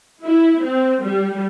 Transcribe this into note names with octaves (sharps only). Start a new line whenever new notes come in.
E4
C4
G3